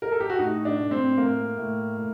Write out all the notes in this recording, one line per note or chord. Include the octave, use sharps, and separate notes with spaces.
A#4
A4
G4
F#4
A2 D#4
D4
A2
C4
A2 A#3
A2
A2